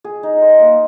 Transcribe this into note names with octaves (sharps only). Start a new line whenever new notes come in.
G#4
D#4
C5
A#3